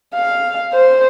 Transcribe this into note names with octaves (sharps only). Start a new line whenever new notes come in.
F5
C5